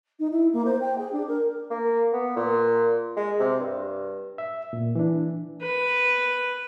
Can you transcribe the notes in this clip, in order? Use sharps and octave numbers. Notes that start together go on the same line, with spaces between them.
D#4
E4
A#3
C5
G5
G#4
D4
A#4
A#3
B3
A#2
G#3
C3
G2
E5
A#2
E3 D4
B4